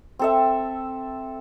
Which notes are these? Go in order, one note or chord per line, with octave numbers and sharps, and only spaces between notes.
C4 A4 E5